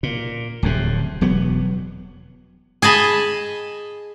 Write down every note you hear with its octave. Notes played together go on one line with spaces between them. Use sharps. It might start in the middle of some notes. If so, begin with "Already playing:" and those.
A#2
D1 F2 C3
E1 F#3 B3
G#4 D#5 A5 B5